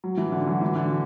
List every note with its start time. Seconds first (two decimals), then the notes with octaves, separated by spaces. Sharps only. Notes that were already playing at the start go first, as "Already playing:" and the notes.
0.04 F#3
0.17 E3
0.32 D3
0.47 F#3
0.61 E3
0.76 D3